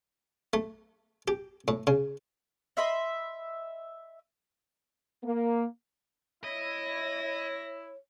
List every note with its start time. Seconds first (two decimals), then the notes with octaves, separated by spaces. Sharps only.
0.53 A3
1.28 G4
1.68 A2
1.87 C#3
2.77 D#5 E5 B5 C6
5.24 A#3
6.44 E4 C#5 D#5 A#6